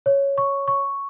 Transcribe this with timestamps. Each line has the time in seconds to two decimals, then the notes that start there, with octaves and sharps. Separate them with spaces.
0.06 C#5
0.38 C#6
0.68 C#6